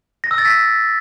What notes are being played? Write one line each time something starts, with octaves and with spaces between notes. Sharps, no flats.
A#6
E6
A6
B6